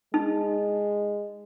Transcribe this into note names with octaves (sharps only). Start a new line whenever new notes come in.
G#3 D#4